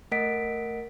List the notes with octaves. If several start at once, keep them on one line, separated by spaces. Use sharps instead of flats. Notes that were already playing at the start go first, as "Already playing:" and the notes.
A3 A#4 D#5 F#5 B6 D7